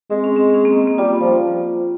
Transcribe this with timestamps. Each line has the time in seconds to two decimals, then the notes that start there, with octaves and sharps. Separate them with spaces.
0.10 G#3 C4
0.24 C#4
0.36 C4
0.50 C4
0.54 C#4
0.65 A#3
0.76 A#3
0.87 A#3
0.98 G3 F4
1.20 F3